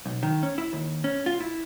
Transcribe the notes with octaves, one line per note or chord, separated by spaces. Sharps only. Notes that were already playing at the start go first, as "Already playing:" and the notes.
B1
D#3
C#4
E4
D#2
C#4
F4
E4